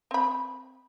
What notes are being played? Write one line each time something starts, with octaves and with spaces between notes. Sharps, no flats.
C4 B5